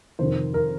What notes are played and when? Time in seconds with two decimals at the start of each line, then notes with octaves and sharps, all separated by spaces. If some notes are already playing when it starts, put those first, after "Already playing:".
0.19 F2 C3 D#3 C5
0.54 A#4